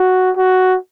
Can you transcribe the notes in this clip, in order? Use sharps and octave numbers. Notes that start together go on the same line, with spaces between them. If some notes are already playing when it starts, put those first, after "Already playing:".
Already playing: F#4
F#4